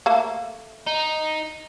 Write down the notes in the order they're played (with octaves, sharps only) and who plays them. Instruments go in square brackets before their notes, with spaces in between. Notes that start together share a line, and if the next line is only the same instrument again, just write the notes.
[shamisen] A3 A#3
[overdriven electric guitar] D#4